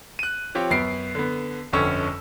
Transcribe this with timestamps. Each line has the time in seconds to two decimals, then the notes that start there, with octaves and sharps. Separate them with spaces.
0.19 F#6 D#7
0.55 F3 C4 G4 C#5
0.71 F#2 B3 C7 D7
1.15 D3 B3
1.73 G1 F2 D3 C#4 C#6 E6